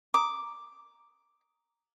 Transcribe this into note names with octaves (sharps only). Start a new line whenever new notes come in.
A#5 D6 D#6